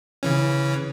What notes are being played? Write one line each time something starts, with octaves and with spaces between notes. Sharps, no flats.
C#3 E3 C#4